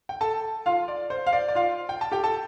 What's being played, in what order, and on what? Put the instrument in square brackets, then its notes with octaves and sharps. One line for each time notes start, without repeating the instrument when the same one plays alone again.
[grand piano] G5
A4 A5
F4 F5
D5
C5
F5
D5
D5
F4 F5
G5
A5
G4 G5
A4 A5